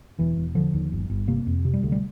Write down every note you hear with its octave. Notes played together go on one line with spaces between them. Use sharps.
E1 E3
E1
D3 F3
D#2
G1
G1
C3 A#3
F2
C3
G3
D2
G3